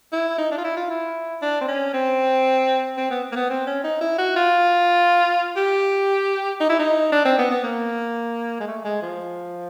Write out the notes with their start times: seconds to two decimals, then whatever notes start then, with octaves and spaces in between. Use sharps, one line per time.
0.12 E4
0.38 D#4
0.51 D4
0.58 F4
0.64 E4
0.76 F4
0.90 E4
1.42 D4
1.61 C4
1.68 C#4
1.94 C4
2.97 C4
3.11 B3
3.32 A#3
3.36 B3
3.50 C4
3.67 C#4
3.84 D#4
4.01 E4
4.18 F#4
4.36 F4
5.57 G4
6.60 D#4
6.69 E4
6.79 D#4
7.12 D4
7.25 C4
7.38 B3
7.51 B3
7.64 A#3
8.60 G#3
8.67 A3
8.85 G#3
9.02 F3